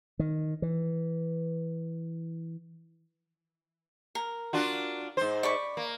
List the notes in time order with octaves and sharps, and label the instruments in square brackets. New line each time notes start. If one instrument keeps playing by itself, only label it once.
[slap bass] D#3
E3
[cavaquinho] A#4
[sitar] D4 F4 F#4
G#2 C5
[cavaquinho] D5 B5 C#6
[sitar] A#3